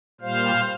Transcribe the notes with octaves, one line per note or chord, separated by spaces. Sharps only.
A#2 G3 C5 F5